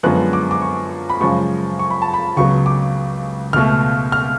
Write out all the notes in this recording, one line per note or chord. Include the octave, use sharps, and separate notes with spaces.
F#2 D3 F3 G#3 B3 F#6
D6
D6
C#6
B5
F#2 C#3 F3 G#3 C#6
C#6
B5
A5
B5
C#2 C#3 F#3 B3 C#6
D6
C#2 B2 A3 F6
F6